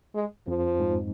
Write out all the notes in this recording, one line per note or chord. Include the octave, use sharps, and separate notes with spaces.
G#3
F2 F3
G#2